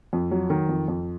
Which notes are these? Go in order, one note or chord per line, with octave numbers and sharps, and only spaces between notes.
F2
F#3
D#3
F2
F2